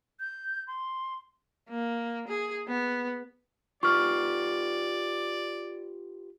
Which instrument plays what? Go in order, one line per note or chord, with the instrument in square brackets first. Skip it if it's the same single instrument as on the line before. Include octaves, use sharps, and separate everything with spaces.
[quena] G6
C6
[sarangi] A#3
G#4
B3
[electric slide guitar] F4 G4 B4 [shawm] D5 [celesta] C#6 F6